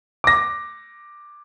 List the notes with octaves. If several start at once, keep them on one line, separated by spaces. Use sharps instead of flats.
D6 A#6